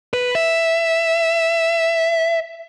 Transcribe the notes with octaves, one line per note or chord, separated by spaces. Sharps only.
B4
E5